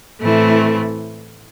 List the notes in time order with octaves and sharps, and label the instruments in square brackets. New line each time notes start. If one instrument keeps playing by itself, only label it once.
[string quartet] A2 E3 A3 C4 E4